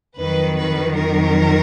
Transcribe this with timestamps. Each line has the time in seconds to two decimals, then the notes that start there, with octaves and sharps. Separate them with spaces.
0.18 F2 D#3 F#3 B4
0.57 B4
0.96 A#4